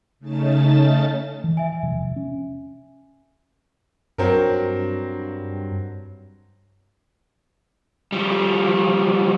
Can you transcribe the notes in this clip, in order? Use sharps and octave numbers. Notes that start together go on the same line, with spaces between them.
C#3 A3 C#4 D#4 A5 A6
E3
E5 G#5
E1 C3 F3
C#4
G2 F#3 C4 A#4
F3 G3